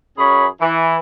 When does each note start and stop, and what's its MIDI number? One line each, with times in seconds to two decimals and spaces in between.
0.18 0.46 42
0.18 0.46 61
0.18 0.46 68
0.18 0.46 73
0.18 0.46 83
0.61 0.97 52